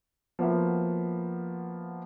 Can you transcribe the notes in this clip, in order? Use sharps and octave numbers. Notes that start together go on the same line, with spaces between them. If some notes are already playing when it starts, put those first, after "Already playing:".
F3 A#3 B3 F#4 E5